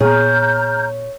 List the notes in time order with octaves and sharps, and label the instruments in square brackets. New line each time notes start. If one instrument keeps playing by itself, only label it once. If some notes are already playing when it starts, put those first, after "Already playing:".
[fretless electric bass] A#2 B3 [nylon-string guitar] G#4 [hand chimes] C#5 [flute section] A#5 F6 G6